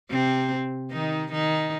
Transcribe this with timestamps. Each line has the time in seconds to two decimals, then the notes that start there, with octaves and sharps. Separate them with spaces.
0.11 C3 C4
0.91 D#3 D#4
1.32 D#3 D#4